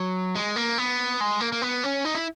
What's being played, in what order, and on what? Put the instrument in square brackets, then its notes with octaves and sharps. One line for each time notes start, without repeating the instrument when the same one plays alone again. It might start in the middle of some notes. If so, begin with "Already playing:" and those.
Already playing: [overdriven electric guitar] F#3
G#3
A#3
B3
G#3
A#3
A#3
B3
C#4
D#4
E4